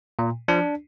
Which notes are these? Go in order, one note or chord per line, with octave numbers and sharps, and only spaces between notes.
A#2
F3 D4